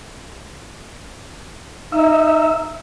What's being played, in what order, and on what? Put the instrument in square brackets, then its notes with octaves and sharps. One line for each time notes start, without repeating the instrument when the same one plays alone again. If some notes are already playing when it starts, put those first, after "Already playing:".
[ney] D#4 [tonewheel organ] E5